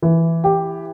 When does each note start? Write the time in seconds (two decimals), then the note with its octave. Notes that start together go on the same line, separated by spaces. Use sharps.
0.02 E3
0.44 G4